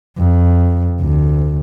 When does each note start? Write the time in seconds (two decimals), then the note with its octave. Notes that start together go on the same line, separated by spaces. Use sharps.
0.18 F2
1.00 D2